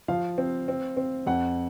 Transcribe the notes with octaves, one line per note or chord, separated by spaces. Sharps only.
F3 F5
C4
C4
C4
F2 F#5